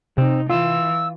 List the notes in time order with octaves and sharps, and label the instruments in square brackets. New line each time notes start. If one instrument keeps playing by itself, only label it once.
[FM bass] C3 [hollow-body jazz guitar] C4 [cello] D#4
[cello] E3 [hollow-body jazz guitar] F4 [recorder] E6